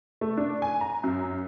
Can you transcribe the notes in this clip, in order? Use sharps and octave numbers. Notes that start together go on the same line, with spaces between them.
A3
D4
G#5
A#5
F#2